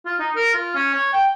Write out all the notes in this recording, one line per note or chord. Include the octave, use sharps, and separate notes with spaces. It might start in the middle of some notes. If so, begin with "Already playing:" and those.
F4
D#4
A#4
F4
C#4
C#5
G5